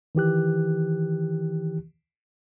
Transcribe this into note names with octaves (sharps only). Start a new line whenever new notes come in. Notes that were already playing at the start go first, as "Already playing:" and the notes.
D#3 E3 G4 F#6